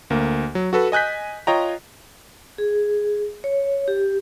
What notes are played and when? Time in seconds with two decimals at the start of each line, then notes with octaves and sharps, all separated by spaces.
0.10 D2 A#3
0.55 F#3
0.73 F#4 A4 B4
0.92 D#5 G#5 F#6 G6 B6
1.47 F4 C#5 D#5 G5 A#5
2.58 G#4
3.44 C#5
3.88 G4